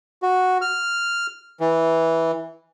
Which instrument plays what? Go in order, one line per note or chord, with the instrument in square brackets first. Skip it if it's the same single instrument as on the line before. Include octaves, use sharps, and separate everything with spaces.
[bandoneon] F#4
F6
E3